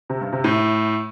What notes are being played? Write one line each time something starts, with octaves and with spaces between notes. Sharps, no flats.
C3
G2
C3
A2